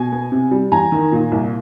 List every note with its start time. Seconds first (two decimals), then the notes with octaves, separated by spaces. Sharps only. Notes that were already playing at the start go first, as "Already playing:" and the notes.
Already playing: B2 G#5
0.12 B3
0.32 C3
0.51 G3
0.72 E2 G#5 A#5
0.92 D#3
1.12 A#2
1.32 C2